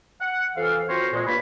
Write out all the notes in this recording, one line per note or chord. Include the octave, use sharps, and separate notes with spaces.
F#5
F2 E3 A4 F5
C4 F4 F#4 A#4 C5 C#5
A#2 G#3
G2 A#3 F4 B4 C#5 B5